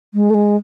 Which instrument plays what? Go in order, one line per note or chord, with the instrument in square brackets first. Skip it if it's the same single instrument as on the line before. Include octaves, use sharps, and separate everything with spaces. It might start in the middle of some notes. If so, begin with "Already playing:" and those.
[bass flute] G#3
A3
G#3